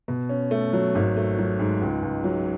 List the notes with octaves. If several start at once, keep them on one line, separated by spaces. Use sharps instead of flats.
B2
C#4
A3
F#3
G#1
A3
F#3
G#2
C#2
C#2
F#3